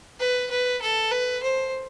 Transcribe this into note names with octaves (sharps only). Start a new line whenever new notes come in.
B4
B4
A4
B4
C5